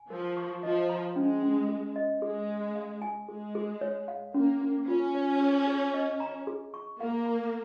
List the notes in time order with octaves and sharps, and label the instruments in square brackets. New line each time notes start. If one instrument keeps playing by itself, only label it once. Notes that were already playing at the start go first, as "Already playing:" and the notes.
Already playing: [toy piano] G#5
[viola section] F3 [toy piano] A#4
[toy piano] C#6
[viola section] F3 [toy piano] D#5
[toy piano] A#5
[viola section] G#3 [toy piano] C#4
[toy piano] C#4
G#4
D#5
[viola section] G#3 [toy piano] G#4
[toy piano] G#4
F5
G#5
[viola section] G#3 [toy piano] G#4
[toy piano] G#4
C#5
F5
[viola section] A#3 [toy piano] C#4
[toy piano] C#4
[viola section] C#4 [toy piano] F4
[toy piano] C#5
G#4
G#4
D#5
A#5
G#4
C#6
[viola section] A#3 [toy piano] F5
[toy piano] A#5